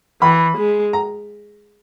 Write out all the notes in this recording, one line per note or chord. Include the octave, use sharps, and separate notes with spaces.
E3 B5
G#3
A#5